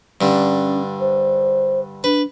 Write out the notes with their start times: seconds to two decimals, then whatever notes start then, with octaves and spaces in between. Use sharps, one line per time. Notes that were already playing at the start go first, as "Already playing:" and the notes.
0.21 G2 D3 C#4
1.00 C5
2.04 D4 B4